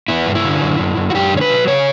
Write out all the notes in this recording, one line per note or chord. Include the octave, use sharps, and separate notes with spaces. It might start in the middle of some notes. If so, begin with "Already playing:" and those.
B3 E4
G2
E4
D3
F#2
F#2
F#2
F#4
F#2 G4
D3 C#5
B4
F#3
C#3 C#5